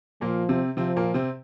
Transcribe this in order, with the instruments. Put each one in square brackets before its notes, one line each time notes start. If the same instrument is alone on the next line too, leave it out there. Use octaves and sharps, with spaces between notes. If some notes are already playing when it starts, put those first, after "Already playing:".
[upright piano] A#2 A#3 [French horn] F3
[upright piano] C3 C4
[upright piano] C3 C4 [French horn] F3
[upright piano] A#2 A#3
C3 C4